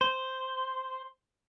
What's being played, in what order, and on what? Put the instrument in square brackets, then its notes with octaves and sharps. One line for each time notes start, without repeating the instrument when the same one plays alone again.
[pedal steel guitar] C5